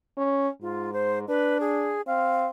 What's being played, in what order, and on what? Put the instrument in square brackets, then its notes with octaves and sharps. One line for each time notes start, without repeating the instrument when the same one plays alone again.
[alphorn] C#4
[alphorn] G#2 [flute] F4
[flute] C5
[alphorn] D4 [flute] B4
[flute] G#4
[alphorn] C4 [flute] F5